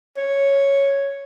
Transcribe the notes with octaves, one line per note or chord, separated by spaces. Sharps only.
C#5